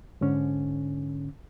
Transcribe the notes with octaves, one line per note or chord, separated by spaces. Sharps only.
G#2 D3 C#4